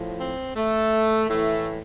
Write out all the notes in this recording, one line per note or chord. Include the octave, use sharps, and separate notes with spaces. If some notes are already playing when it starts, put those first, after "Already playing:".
Already playing: A2 F3
C4
A3
A2 E3 A3